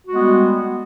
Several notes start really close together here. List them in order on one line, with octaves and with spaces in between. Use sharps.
F#4 G#3 G3 B3